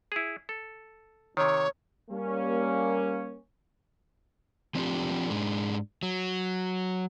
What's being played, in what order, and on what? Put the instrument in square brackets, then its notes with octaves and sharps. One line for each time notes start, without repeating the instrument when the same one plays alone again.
[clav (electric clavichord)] E4 G#4
A4
[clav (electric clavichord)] C3 D#3 [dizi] C#5
[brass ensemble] G3 A#3 C#4
[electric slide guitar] F3 C4 D4 F4 G4
G#2 G#3 D4
F#3